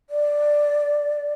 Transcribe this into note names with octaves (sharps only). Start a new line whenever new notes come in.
D5